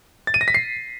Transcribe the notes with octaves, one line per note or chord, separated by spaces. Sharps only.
A6
D#7
A#6
B6
C7